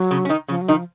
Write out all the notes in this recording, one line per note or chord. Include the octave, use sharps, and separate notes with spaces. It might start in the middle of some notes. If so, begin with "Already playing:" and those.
Already playing: F#3
C#3 C#4
C#4
D#3 D#4
C#3 F3 C#4
F#3
D#3 D#4
F3